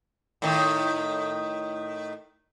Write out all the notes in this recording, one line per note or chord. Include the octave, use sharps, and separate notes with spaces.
A2 D#3